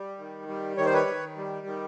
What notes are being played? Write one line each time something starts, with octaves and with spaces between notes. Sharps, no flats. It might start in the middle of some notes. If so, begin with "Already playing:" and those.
Already playing: G3
D#3
G3
D#3 C#5
C5
B4 C#5
D#3
G3
D#3